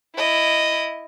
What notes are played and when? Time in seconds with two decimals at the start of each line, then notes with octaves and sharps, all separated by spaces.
0.16 E4 D#5